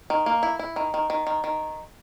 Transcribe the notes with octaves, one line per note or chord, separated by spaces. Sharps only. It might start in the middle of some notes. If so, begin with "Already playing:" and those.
D#3
A#3
E4
E4
D#3
D#3
D#3
D#3
D#3